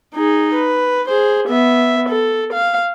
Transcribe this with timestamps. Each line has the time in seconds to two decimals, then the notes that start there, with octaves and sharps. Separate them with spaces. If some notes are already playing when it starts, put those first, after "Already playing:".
0.15 D#4 G#4
0.55 B4
1.09 G#4 C5
1.48 B3 E5
2.09 A4
2.53 F5